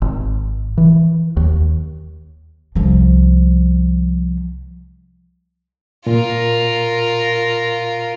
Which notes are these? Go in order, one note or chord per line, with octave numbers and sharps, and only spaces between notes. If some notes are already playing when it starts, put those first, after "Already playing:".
G#1
E3
D#2
C2 F3
A#2 F4 A#4